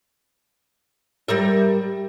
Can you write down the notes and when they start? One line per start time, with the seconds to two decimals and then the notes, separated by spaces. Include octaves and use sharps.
1.28 G3 A#4 E5